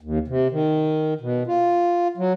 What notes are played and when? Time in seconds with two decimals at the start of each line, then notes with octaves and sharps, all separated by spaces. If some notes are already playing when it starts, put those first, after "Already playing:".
0.01 D#2
0.28 C3
0.51 D#3
1.21 B2
1.47 F4
2.17 F#3